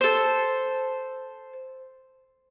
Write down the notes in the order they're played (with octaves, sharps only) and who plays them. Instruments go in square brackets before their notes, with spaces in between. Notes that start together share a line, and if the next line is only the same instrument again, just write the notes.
[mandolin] A4 C5